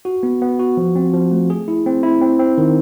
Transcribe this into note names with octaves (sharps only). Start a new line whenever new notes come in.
F#4
B3
B3
F#4
F3
C4
F3
A3
G#4
E4
C4
E4
C4
C4
D#3